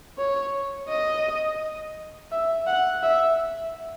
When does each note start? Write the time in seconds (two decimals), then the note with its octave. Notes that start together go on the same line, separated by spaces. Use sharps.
0.18 C#5
0.89 D#5
2.32 E5
2.67 F#5
3.03 E5